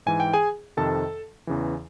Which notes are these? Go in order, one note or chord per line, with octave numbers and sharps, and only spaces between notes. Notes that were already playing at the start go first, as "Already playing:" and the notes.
G#2 E3 G#5
G5
G#4 G#5
F2 C3 D#3 A4 A5
E2 C#3 E3